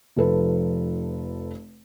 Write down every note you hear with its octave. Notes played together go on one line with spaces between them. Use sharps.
F1 F3 A4 B4